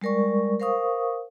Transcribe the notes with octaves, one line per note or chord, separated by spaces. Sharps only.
G3 G#3 A#4 D5 C#6
A#4 C5 F5 C#6 D#6